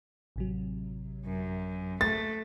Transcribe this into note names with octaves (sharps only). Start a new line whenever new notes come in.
A1 C3 F#3
F#2
A3 A6